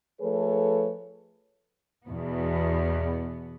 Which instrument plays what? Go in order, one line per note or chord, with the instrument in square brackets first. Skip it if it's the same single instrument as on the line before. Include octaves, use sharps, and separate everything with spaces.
[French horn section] F3 A3 G#4 A4 B4 C#5
[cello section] E2 B2 B3